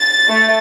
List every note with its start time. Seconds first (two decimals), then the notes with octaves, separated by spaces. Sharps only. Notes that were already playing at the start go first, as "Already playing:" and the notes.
Already playing: A6
0.29 A3